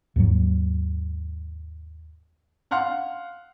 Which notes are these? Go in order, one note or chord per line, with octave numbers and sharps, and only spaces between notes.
D#2 G#2 F#3
F5 F#5 C6 F6